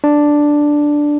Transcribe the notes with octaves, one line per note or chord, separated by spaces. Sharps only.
D4